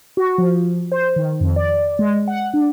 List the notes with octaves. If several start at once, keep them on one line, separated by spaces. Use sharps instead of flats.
F#4
F3
C5
D#3
F2
D5
G#3
F#5
D4